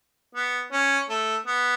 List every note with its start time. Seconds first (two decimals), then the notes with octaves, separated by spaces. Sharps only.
0.35 B3
0.73 C#4
1.09 A3
1.47 B3